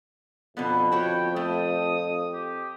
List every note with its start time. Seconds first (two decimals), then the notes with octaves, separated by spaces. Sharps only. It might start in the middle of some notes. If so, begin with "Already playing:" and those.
0.57 F2 B2 D3 B3
0.92 E4 F#4 C#5 G5
1.36 A3 D#6
2.33 G4